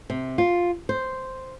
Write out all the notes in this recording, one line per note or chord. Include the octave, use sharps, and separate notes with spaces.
C3
F4
C5